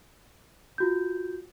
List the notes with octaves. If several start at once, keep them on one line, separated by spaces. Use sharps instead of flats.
F4 F#4 G6